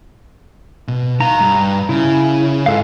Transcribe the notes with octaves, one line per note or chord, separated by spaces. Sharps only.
B2
D#4 F5 A#5
G2
C#3 E4
G#2 F4 A4 F5